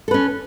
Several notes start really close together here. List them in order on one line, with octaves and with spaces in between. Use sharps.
A4 B4 C#4